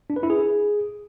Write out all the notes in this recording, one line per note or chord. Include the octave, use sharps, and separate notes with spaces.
D4
B4
E4
G#4